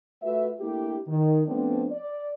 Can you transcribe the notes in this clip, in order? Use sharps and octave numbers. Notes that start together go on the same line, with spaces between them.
A3 F4 F#4 B4 E5
A3 A#3 D4 E4 G4
D#3
F3 A3 B3 C4 D4
D5